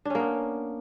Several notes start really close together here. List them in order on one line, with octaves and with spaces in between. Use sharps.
D4 C#4 A#3 B3